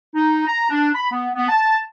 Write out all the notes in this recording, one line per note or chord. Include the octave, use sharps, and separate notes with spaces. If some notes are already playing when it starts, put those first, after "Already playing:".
D#4
A#5
D4
B5
B3
B3
A5